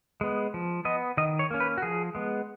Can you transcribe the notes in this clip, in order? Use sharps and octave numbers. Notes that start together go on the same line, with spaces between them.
G#3 B3
F3
B3 D#5
D#3 D#5
C#5
A#3 C#4
B4
F#4
F3 G#4
G#3 B3